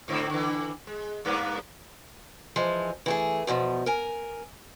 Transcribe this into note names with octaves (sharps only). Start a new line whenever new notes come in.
G#2 D3 C4
D3 E3
G#3
G2 A#3 B3
E3 F3 G#3
E3 A3 G#4
E2 B2 E3 F3
A#4 G#5